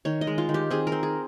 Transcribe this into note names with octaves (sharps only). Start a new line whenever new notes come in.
D#3 C#5
D#5
G#3
F4
D#3
G4
C4 G#4
A#4
C4
G#4